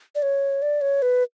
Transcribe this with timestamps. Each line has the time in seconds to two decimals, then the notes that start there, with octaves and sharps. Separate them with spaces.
0.15 D5
0.22 C#5
0.62 D5
0.81 C#5
1.02 B4